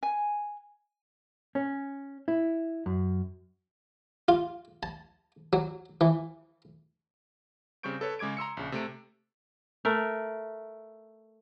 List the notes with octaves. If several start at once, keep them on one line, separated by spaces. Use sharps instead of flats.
G#5
C#4
E4
F#2
F4
A5
F#3
E3
C#3 G3 C4 C#6 G6 D7
A4 B4 C#5
C#3 G#3 D6 G#6 D7
A#5 C6 E6 C#7
A#1 C#3
C3 A3 D7
A3 A#4